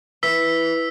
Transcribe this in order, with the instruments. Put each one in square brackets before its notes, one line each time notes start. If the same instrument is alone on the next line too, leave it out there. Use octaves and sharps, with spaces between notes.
[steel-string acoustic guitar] E3 [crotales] E6 B6